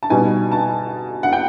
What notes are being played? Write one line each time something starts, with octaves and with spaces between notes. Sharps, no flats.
A5
B2 G3 B3 D#4 G#5
A5
F#5
G5